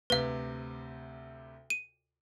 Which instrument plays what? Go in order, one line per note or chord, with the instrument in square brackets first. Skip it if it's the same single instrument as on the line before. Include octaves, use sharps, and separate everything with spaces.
[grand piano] D2 C3 [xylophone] B4 F5
[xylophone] D#7